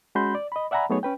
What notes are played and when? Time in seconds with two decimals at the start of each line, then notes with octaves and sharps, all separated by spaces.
0.15 G#3 C#4 F#4 B5 C6 G6
0.35 D5
0.52 D#5 B5
0.71 D5 E5 F#5 G#5 A#5 B5
0.90 F#3 A3 B3 D#4 G#4 C#5
1.03 C#4 B4 G5